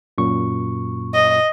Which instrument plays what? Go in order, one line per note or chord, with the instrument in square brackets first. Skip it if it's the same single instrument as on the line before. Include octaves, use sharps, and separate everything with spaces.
[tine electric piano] F#2 A#2 C#6
[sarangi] D#5